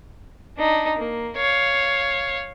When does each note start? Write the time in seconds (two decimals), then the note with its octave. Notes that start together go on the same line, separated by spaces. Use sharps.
0.57 D4 D#4
0.98 A#3
1.37 C#5 F5